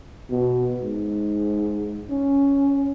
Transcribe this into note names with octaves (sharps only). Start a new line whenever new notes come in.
B2
G#2
C#4